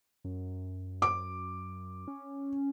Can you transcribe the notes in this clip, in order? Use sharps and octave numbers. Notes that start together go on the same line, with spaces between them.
F#2
D6
C#4